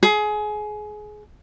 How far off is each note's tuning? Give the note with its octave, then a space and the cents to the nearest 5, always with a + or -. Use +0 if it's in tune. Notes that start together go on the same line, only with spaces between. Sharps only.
G#4 +25